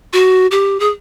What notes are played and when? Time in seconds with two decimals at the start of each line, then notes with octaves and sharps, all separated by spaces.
0.13 F#4
0.51 G4
0.80 G#4